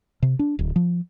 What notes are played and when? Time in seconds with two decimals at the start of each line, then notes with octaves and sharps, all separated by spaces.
0.22 C3
0.39 D4
0.59 D1
0.76 F3